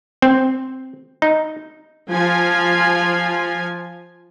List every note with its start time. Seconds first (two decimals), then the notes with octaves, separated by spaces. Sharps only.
0.22 C4
1.22 D#4
2.10 F3 F4 G#5